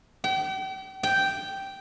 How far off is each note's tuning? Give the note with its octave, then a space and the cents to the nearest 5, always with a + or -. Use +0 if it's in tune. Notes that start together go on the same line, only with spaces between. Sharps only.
G5 -40
G5 -5